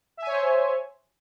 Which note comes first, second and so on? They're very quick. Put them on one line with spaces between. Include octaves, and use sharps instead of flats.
E5 G#5 C#5 C5